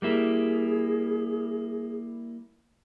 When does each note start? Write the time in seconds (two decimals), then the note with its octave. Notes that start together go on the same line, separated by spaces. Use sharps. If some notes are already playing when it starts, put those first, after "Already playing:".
0.02 G3 A#3 E4 G#4